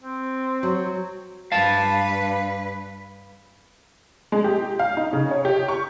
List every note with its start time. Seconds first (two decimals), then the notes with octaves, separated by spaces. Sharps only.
0.02 C4
0.63 F#3
1.52 G2 B4 F5 A5
4.32 G#3
4.44 G4
4.79 F5
4.97 D#4
5.13 C#3
5.31 C#5
5.45 G4
5.68 C#6